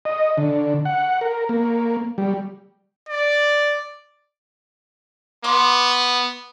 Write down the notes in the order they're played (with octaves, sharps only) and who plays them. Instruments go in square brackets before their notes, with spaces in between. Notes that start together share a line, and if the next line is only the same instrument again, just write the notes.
[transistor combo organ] D#5
D3
F#5
A#4
A#3
G3
[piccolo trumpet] D5
[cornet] B3 [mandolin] C6 D6